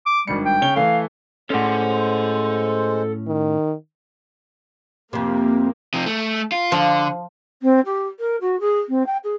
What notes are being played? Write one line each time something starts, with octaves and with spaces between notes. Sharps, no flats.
D6
G#1 G2 G3 C#7
G5
C#3 C#5 G7
E3 A3 F5
A2 G#3 C#4 A4 C5 F#5
D#3
F2 C3 A#3
C3 F3
A3
F4
D3 F3
C4
G4
A#4
F#4
G#4
C4
G5
G#4